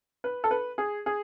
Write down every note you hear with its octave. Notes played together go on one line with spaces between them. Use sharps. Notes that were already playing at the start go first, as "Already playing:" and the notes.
B4
A4
B4
G#4
G#4